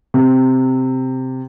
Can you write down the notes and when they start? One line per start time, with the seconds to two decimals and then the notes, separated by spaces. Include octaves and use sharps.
0.14 C3